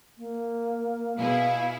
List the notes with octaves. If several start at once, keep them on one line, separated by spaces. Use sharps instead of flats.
A#3
B2 E4 G#4 F5